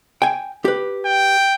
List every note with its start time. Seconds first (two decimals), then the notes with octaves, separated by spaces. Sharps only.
0.22 G5 G#5
0.65 G4 B4
1.05 G5